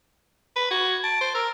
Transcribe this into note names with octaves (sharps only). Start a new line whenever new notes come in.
B4
F#4 G#6
A5 D7
C5
A#4 E6